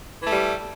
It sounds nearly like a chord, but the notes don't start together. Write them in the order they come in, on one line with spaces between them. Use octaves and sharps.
E3 A3 G3